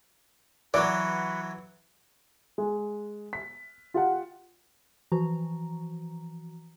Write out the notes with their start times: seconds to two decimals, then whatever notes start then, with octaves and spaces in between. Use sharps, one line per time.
0.74 E3 F#3 F#4 B4 D5 F#5
2.58 G#3
3.33 B6
3.94 F4 G4 F#5
5.12 E3 F3 F#4 A#5